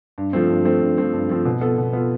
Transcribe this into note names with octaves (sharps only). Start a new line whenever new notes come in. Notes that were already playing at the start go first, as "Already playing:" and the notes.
G2
F3 A3 C4
G2
F3 A3 C4
G2
F3 A3 C4
G2
F3 A3 C4
B2
B3 F4 A4
B2
B3 F4 A4